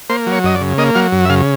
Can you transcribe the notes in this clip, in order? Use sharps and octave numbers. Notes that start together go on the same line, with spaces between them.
A#3 C5
F#3
C#5
F#2 D#5
D5
C#3
A#3 D#5
F#3 F5
F#2
E5
C#3 F5